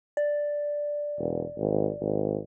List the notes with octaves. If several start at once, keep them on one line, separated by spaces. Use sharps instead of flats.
D5
E1
G#1
G#1